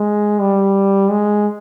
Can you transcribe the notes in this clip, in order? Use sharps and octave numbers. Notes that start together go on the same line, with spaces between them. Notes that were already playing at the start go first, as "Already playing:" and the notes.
Already playing: G#3
G3
G#3